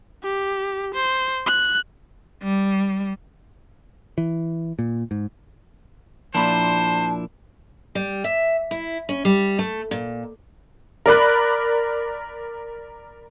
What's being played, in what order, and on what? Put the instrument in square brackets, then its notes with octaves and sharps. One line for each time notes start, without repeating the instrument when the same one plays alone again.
[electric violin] G4
C5
F#6
[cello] G3
[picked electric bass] E3
A#2
G#2
[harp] A#2 B5 C6 [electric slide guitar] F3 D4 E4 [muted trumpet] C5 [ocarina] A5
[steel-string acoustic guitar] G3
E5
E4
C#4
G3
A3
A#2
[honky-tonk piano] A#4 D5 B5 F#6